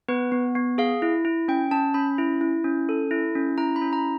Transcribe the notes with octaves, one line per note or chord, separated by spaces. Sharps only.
B3 B4
B3
B3
G#4 F5
E4
E4
C#4 G5
C#4 A5
C#4 B5
E4
E4
C#4
A4
E4
C#4
E4 A#5
B5
C#4
A#5